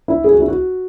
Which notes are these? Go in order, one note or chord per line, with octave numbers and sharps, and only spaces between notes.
E4
G#4
F#4
E4
F#4